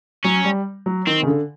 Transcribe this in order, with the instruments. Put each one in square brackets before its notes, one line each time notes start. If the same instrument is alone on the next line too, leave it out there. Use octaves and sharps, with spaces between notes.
[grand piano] F#3 [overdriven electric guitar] C#4
[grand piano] G3
F#3
[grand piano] D#3 [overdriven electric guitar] C4
[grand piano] C#3
D3